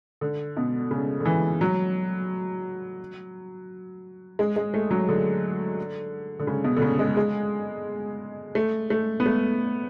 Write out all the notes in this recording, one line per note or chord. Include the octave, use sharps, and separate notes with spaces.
D3
B2
C#3
D3
E3
F#3
G#3
G#3
A3
F#3
D3
D3
C#3
B2
D3
C#3
G#3
G#3
A3
A3
B3
A3